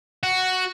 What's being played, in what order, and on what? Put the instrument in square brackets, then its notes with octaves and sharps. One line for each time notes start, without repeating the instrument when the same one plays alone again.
[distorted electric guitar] F#4